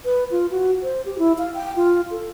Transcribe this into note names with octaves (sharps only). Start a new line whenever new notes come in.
B4
F4
F#4
C5
G4
E4
F5
G5
F4
A4